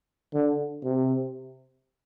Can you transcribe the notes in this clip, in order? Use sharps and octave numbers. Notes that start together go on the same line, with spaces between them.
D3
C3